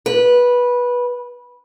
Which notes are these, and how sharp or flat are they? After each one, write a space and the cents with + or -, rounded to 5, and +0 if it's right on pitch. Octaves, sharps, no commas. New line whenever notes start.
B4 -15